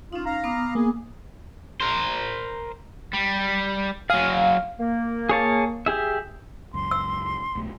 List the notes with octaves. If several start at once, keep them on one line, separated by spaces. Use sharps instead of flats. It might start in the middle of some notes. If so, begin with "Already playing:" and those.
C#4 D#4 F4
F5 A#5
B3 D6 D#6
A#3 G#4
A#4 C5
G3
F#3 G#4 F5
A#3
G#4 C#5 A5
G4 G#4 E5
C#2 F#2 C6
E6
E1 B1 A3